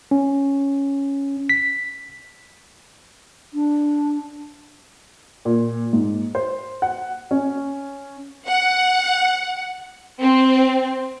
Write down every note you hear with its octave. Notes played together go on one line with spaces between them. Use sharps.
C#4
B6
D4
A#2
G#2
C5
F#5
C#4
F#5
C4